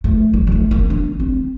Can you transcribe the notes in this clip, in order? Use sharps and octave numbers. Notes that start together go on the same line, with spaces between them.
A3
G3
G3
A3
A#3
D4
C4